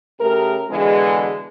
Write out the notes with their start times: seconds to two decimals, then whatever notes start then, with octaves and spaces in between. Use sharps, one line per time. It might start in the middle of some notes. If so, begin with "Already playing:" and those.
0.20 C#3 A3 G4 A#4
0.69 B2 D3 E3 G#3